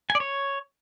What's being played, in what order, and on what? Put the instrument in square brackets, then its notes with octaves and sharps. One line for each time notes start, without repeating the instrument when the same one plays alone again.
[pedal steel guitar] G#5
D5
C#5